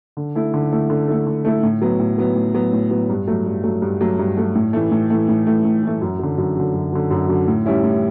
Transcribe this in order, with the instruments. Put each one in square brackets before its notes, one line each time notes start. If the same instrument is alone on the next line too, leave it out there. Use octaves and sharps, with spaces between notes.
[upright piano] D3
A3 E4 A4
D3
A3 E4 A4
D3
A3 E4 A4
D3
A3 E4 A4
A2
F#3 B3
A2
F#3 B3
A2
F#3 B3
A2
F#3 B3
G2
F#3 A3
G2
F#3 A3
G2
F#3 A3
G2
F#3 A3
A2
E3 A3
A2
E3 A3
A2
E3 A3
A2
E3 A3
F#2
D3 F#3
F#2
D3 F#3
F#2
D3 F#3
F#2
D3 F#3
A2
G3 C#4 E4
A2